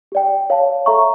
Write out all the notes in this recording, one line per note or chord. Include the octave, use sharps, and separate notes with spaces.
G4 D5 G5
C#5 F5 A5
A4 E5 A#5 C#6